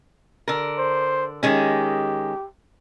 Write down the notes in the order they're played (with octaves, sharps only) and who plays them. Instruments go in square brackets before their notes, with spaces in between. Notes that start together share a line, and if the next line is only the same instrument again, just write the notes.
[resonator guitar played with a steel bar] D3 A#4
[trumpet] C5
[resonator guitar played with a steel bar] D#3 G#3 C#4 [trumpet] G4